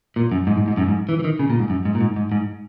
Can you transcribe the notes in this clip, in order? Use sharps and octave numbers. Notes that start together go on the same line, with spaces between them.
A#2
F#2
G#2
G#2
G#2
F#2
G#2
E3
E3
D#3
C#3
A#2
G#2
F#2
G#2
A#2
G#2
G#2
G#2